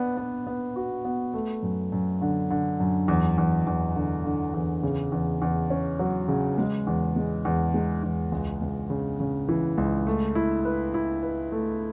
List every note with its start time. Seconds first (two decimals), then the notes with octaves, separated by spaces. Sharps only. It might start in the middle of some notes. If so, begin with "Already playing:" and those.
Already playing: B3 D4
0.17 B3
0.47 B3
0.76 F#4
1.05 B3
1.34 A3
1.63 F#2
1.92 F#2
2.21 D3
2.50 D3
2.80 F#2
3.08 E2
3.38 E2
3.67 E2
3.95 D3
4.25 D3
4.54 E2
4.83 C#3
5.12 E2
5.42 E2
5.70 C#4
5.99 F#3
6.28 C#3
6.58 G#3
6.87 E2
7.16 G#3
7.45 E2
7.74 G#3
8.03 E2
8.32 C#2
8.61 C#2
8.90 C#3
9.20 C#3
9.49 E3
9.78 C#2
10.07 A3
10.35 E4
10.65 B4
10.94 E4
11.23 B4
11.52 A3